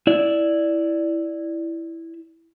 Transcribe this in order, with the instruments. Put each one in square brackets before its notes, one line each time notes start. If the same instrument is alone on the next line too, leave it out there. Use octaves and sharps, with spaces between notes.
[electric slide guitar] E4 D5